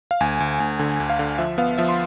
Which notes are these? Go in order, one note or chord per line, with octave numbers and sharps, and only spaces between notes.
F5
D2 G#5
D2
D2
D3 G#5
D2
F5
D3
F3 E5
B3 F5
F3 E5
C6